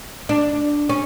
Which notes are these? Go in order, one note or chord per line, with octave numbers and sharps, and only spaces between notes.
D4
C#4